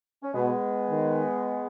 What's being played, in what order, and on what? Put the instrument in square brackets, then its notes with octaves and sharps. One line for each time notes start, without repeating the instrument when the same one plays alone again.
[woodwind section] C#4
[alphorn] B2 [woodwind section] G#3 B3
[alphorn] D#3